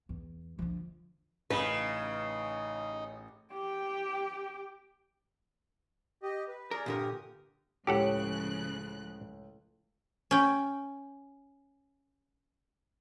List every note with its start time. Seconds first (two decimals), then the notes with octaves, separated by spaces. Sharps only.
0.09 E2
0.59 D3 F3
1.50 A1 C#3 D#4 B4
3.54 G4 G5
6.23 G4 D#5
6.48 B4
6.71 G#4 A#4 D5
6.86 G2 A#2 D3 G4 A#4 D#6
7.87 C#2 A2 C#3 F3 G4 A4 F#5 F#6
10.31 C#4 G5